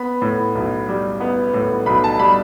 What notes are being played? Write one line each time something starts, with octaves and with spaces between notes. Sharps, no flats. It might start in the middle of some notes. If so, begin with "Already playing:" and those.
Already playing: B3 B5
A2
B1
G3
B3
A2
B1 B5
A5
G3 B5